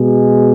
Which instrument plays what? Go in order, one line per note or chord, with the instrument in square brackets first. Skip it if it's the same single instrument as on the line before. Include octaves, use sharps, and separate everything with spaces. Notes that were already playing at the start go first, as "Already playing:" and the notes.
Already playing: [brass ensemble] B2 G#3